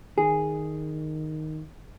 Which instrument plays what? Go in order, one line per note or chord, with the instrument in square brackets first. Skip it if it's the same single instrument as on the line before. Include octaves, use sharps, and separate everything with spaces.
[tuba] D#3 [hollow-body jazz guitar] G#4